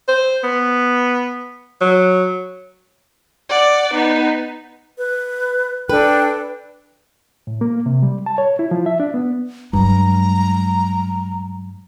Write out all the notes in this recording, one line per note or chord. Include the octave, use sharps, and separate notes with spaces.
C5
B3
F#3
D5 F#5
B3 D#4
B4
D4 A4 B4 G5 F#6
A2
A#3
C3
G3
A5
C#5
E4
F3
E5
D4
B3
G2 F#3 G#3 A#5